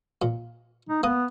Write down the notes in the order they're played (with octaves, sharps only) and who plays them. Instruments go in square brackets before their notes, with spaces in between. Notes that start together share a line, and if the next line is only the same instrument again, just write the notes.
[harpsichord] A#2
[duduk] D#4
[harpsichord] A#3 D#6 [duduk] B3